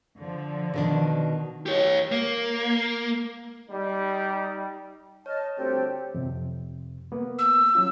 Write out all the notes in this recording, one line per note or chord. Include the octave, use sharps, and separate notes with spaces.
D3 F3
B2 D#3 D4
G4 C#5
A#3
G3 D#4
C#5 D#5 A5 F6
D2 G3 C4 G4 A4
F2 C3
A#3 B3
E6
F#3 C#4 F4